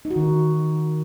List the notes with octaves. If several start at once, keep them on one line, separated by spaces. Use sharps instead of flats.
D#4
F#4
D#3